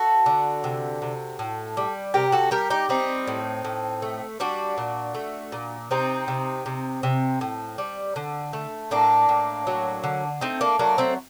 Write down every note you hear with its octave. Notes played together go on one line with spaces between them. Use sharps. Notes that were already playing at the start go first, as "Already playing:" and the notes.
Already playing: F#4 A4
D3
C3
C3
A2
G3
C3 G4 A#4
F#4 A4
G3 G4 A#4
D#4 G4
G3 C4 D#4
A2
A2
A3
G3 D4 F#4
A#2
A3
A#2
C3 C4 D#4
C3
C3
C3
A2
G3
D3
A3
A2 A#3 D4
A2
F#3
D3
A3 C4 D#4
A#3 D4
F#3 A#3 D4
A3 C4